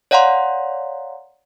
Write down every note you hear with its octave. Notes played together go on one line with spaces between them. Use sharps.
C#5 D5 F5 F#5 A#5 C6